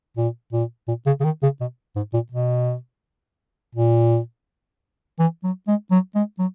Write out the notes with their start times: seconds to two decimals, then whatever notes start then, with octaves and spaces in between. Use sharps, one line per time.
0.17 A#2
0.53 A#2
0.88 A#2
1.07 C#3
1.21 C#3
1.24 D#3
1.43 C#3
1.61 B2
1.96 G#2
2.13 A#2
2.32 B2
3.75 A#2
5.19 E3
5.44 F#3
5.67 G#3
5.91 F#3
6.15 G#3
6.39 F#3